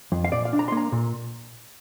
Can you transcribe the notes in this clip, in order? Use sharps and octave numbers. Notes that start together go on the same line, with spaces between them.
F2
F5
A#2 D5
F5
D4
A#5
C6
A#3
A#5
A#2